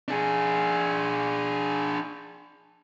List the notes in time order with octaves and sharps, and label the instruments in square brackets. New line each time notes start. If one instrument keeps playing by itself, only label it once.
[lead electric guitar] D4 G#4